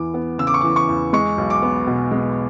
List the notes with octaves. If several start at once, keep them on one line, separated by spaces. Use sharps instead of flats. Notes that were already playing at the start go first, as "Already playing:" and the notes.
Already playing: E2 E3 D6
B3
C#3 E6
D6
C#6
E3 D6
C#6
E2
G#3 C#6
B1
D6
B3
B2
G#3